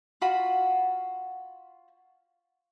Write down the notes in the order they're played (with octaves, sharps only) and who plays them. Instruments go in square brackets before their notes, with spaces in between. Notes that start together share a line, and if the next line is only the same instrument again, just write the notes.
[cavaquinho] F4 F#4 B5